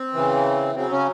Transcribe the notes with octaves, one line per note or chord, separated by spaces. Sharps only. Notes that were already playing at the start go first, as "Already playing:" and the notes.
Already playing: C4
C#3 E3
C#3 F#3 C4
C#3 C#4